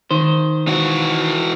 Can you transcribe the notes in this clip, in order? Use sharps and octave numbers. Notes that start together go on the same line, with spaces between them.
D#3 C5
E3 F#4